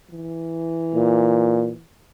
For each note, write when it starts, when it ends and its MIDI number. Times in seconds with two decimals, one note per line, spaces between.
0.11 1.86 52
0.95 1.72 46